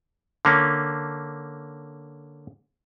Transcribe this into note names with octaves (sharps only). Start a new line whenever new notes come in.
D3 A#3 C#4